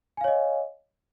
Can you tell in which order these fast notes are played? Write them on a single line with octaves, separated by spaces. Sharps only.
G#5 F5 C#5 D#5